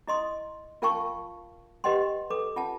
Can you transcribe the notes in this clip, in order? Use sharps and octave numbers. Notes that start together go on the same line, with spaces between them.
E4 D#5 C6 D#6
F4 A#4 F5 G5 A5 C#6
G4 B4 D#5 F#5 G5 C6
A4 B4 D6
F4 F#5 A5